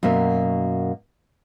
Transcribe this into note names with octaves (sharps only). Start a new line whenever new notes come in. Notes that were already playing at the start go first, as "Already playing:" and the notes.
F#2 B2 A#3 E5